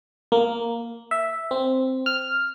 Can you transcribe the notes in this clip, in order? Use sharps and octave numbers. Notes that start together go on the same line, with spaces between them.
A#3
E5
C4
F6